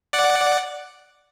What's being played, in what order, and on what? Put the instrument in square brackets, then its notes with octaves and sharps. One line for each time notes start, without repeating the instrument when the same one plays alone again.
[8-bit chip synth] D5 F#5